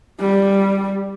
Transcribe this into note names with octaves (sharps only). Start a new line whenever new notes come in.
G3